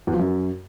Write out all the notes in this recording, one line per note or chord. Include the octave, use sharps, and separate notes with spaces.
E2
F3
F#2